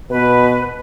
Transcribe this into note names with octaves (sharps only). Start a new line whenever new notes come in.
B2 B4